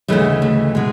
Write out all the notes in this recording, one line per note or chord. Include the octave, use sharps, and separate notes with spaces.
D2 C#3 E3 G#3 A3
A3
B2 G#3